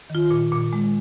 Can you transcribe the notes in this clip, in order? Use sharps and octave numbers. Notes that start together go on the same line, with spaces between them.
D#3 F4
A#2
A#2
G#3